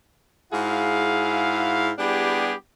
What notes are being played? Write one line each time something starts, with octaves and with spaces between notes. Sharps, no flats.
G#2 E4 F#4 G#4 F5
G3 B3 D4 E4 G4 G#4